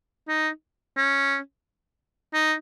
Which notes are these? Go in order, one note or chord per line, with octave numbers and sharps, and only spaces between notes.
D#4
C#4
D#4